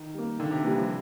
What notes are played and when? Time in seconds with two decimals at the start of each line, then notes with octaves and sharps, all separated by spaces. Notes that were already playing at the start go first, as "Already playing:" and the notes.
Already playing: D#3
0.14 G3 A#3
0.39 D3 D#3
0.51 C3
0.63 E3 G3 A#3
0.77 F3